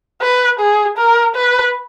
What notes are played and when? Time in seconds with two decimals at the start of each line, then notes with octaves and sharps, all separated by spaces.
0.22 B4
0.60 G#4
0.98 A#4
1.36 B4